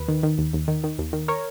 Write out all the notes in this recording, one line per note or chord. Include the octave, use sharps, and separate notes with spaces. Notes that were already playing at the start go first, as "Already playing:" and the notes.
Already playing: D#2 B4
D#3
D#3
D#2
D#2
D#3
D#3
D#2
D#3
A#4 C#5